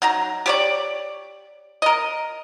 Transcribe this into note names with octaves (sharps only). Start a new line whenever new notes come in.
F#3 D#4 A#5
G4 C#5 D5
A#4 D#5